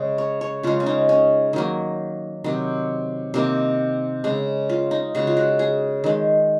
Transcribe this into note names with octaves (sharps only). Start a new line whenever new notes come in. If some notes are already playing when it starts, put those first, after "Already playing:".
Already playing: C#3 G#3
C#5
C#5
C#3 G#3 F4
C#4
D#4
C#4
D#3 F#3 A#3
C3 D#3 F#3
C3 D#3 A#3
C#3 G#3
F4
D#4
C#3 G#3 F#4
F4
F#4
G#4
D#3 G#3